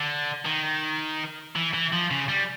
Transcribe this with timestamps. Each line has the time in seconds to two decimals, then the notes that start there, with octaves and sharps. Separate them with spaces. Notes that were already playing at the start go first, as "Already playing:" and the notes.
Already playing: D3
0.46 D#3
1.56 E3
1.74 E3
1.93 F3
2.11 C#3
2.29 G3